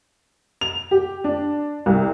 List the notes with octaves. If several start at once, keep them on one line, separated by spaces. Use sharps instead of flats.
F7
G4
D4
C2